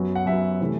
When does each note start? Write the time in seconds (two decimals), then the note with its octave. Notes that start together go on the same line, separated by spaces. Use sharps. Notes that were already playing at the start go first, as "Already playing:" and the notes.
Already playing: F#2 F#3 B3
0.15 F#5
0.26 F#2 F#3 B3 E5
0.61 C3 E3 A3